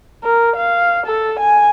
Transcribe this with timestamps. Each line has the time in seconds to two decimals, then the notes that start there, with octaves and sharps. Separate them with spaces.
0.24 A#4
0.56 F5
1.07 A4
1.40 G#5